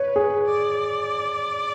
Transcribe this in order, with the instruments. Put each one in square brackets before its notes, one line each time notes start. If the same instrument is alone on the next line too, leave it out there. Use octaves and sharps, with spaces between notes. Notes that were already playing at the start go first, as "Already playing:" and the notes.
Already playing: [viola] B4 [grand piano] C#5
[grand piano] G#4
[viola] D5